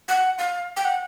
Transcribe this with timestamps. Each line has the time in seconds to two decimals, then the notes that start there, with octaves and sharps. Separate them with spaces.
0.08 F#5
0.38 F5
0.76 G5
0.85 F#5